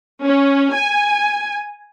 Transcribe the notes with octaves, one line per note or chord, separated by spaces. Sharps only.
C#4
G#5